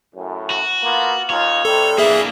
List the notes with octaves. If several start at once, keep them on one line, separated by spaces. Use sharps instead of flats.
F#2 A2
F#4
A#3 B3 F4
D#2 D#4 F4 C#5
C3 G3 A4
E3 A#3 D4 G#4 E5